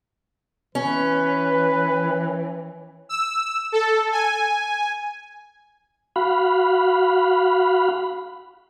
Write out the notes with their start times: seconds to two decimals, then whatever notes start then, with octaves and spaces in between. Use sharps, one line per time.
0.75 E3 C#4 B4
3.09 E6
3.72 A4
4.12 G#5
6.16 F#4 F5 B5